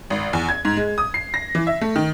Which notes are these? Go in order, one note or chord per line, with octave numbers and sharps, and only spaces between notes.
G#1
E2
G#6
G#2
G#3
D#6
C7
A#6
E3
E5
A3
D#3